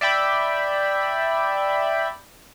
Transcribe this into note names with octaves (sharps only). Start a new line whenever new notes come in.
D5 E5 G5 B5